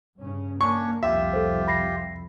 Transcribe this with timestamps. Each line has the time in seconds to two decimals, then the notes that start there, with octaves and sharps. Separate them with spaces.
0.18 G2 C#3 C#4
0.61 A#3 C#4 D4 C#5 C#6
1.03 C2 F2 F4 G4 E5
1.33 A4 C5
1.67 B5 A#6 C7